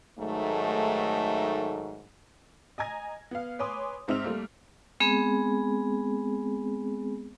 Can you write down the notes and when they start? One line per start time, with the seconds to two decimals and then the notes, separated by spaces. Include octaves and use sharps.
0.18 G#2 D#3 F#3 A3
2.78 D#5 G#5 A#5 G#6 A#6
3.31 B3 F5
3.59 B4 C#5 G#5 C6 D6 D#6
4.08 G#2 C4 D#4 E5 F6 F7
4.24 G3 A3 A#3
5.00 G#3 B3 C4 G#4